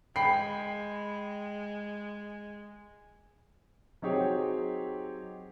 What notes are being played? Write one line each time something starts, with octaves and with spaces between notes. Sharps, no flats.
G#3 G5 B5 C7
F#3 C4 D#4 G4 G#4 C#5